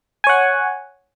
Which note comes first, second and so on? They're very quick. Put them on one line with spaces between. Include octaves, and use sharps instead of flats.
G#5 C#5 F#5